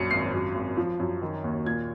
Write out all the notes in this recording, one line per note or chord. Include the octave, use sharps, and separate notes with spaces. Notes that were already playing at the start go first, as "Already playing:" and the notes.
Already playing: A#1 F#2 C#7
G#1 C7
F#2
G#1
F3
F#2
D#3
D#2
A#2 G#6